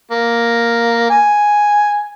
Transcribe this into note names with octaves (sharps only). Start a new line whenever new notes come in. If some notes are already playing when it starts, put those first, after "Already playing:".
A#3
G#5